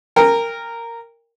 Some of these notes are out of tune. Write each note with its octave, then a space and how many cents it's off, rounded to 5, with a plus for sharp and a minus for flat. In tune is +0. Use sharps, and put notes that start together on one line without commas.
A#4 -10 G5 +30